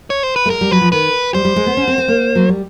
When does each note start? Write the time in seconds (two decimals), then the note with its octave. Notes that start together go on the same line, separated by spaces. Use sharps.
0.10 C#5
0.23 C5
0.36 B4
0.46 A3
0.50 G#3 A#4
0.61 G3
0.71 F#3 B4
0.81 F3
0.92 D#3 B4
1.34 G3 C5
1.45 G3
1.56 G#3
1.66 B3
1.77 C#4
1.87 C4
1.98 C4
2.08 A#3
2.35 F#3
2.49 G3